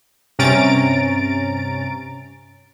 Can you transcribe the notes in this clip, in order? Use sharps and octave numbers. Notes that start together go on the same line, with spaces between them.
G2 C3 C#4 A#5 A6 D7